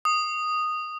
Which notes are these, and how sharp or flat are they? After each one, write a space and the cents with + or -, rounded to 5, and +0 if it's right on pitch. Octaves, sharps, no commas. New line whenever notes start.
D#6 -10